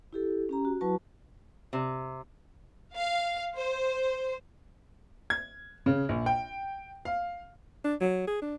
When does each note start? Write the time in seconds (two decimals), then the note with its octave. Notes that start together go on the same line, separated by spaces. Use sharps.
0.13 E4 G4 A4
0.49 C#4 G4 A#5
0.65 F#4
0.81 F#3 E4 F#4 B4 A5 C#6
1.73 C3
2.95 F5
3.54 C5
5.30 G#6
5.86 C#3
6.09 A#1
6.26 G5
7.05 F5
7.85 D4
8.01 F#3
8.28 G#4
8.42 D4